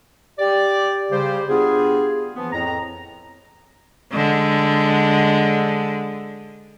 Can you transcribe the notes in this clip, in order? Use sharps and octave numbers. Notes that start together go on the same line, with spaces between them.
G4 D5
C#3 G3 G4 C5
B3 D4 F4 G4 G#4
E3 F3 B3
F2 A2 A#5
D3 G#3